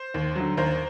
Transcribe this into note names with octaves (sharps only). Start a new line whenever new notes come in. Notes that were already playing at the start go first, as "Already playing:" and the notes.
Already playing: C5
D#2
D3 F#3
D#2 A#4 C5